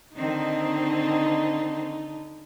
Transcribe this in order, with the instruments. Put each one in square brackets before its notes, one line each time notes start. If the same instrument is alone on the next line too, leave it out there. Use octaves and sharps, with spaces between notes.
[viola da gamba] D3 D#4 [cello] D#3 C4